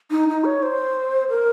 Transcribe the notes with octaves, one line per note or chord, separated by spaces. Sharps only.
D#4
D#4
C#5
C5
A#4